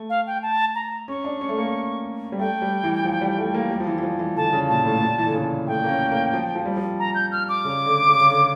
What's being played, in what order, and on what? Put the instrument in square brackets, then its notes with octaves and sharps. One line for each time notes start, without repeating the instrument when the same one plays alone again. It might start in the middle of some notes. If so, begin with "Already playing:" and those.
Already playing: [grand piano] A3
[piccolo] F5
G5
A5
A#5
[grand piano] C#4 [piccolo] C#6
[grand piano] D4
C#4
A3
A#3
G3
[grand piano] A3 [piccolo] G5
[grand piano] G3
E3
F3
G3
A3
A#3
G3
F3
E3
E3
F3
E3
[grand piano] D3 [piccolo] A5
[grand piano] C#3
[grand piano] A#2 [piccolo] A5
[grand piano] A2
A#2
E3
D3
C#3
[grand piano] A3 [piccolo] G5
[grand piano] A#3
C#4
A#3
F3
F3
G3
F3
[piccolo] A#5
G6
F6
D6
[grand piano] C#3
D3
C#3
C#3
D3